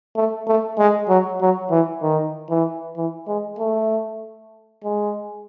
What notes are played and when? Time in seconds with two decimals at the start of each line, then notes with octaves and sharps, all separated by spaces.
0.16 A3
0.47 A3
0.78 G#3
1.09 F#3
1.41 F#3
1.71 E3
2.02 D#3
2.50 E3
2.97 E3
3.28 G#3
3.59 A3
4.84 G#3